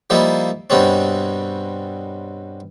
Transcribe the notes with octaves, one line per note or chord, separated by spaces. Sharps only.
F3 G3 A#3 D#4 E4
G2 B2 G3 C4 C#4